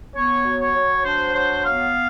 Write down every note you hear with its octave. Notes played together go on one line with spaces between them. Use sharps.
B3 C#5
F#3
C#5
F#3
D4 C5
F#3 C5
B3 F5